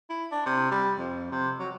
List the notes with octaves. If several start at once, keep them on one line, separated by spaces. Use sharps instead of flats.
E4
D4
C3
G3
F2
C3
F#3